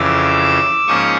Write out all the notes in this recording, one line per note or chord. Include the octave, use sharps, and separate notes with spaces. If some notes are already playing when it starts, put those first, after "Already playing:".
Already playing: F2 C#3 E3 D6 E6
G#2 F3 A#3 C#4 C#6 D#6